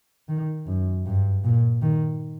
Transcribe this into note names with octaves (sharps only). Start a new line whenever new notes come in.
D#3
F#2
G2
A#2
D#3